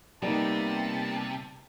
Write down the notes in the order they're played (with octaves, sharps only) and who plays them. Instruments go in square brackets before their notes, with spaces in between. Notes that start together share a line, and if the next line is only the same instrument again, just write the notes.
[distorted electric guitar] C3 [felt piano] G3 D#4 D5 [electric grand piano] A#3 B3 [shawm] A5